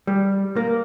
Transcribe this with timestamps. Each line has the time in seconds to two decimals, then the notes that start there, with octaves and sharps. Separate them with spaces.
0.07 G3
0.56 A#3